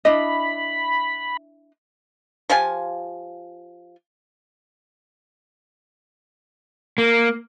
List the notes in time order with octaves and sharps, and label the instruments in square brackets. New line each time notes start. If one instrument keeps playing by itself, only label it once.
[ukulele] D4 E4 D#5 [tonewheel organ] B5
[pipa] F3 F4 G4 G#5
[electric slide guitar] A#3